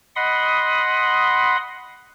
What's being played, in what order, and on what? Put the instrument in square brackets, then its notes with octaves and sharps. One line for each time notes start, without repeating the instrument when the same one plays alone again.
[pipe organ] D#5 F#5 B5 C6 D#6